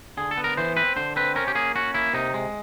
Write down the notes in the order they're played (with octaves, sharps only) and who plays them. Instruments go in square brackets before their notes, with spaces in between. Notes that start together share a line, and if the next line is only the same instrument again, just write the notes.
[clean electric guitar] D3 G#4
A4
B3
A#4
E3 C5
C4 B4
D3 C5
C4 B4
C#4 A#4
G4
A#3 G#4
C#4 F#4
A#3 E4
C3 D#4
G#3